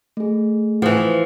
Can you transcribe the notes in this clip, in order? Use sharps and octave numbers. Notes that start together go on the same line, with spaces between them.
A3 G#4
E3 F3